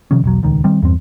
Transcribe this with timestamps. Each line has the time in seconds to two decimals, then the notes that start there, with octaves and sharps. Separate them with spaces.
0.11 C3 D#3 F3 C#4
0.24 E1 B1 F#3
0.43 D#1 C#2 D#3
0.64 D#3 G3 C4
0.83 E2 G2 C4